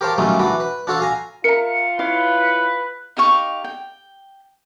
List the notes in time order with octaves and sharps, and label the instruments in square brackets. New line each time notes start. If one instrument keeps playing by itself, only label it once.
[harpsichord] G4 A#4 C5 C#5 F5 A5
D#3 F#3 G3 A3 C#4 F4
E3 D4 F#4 B4
B4
D4 F4 F#4 A4 C#5 C#6
F5 G#5 A#5
[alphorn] F4 [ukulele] A#4 E5 A#5 [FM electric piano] C#7
[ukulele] E4 C#5 F5 [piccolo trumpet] B4
[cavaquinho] D#4 G4 F5 C#6
G5